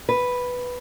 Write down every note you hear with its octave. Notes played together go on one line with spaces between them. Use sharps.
B4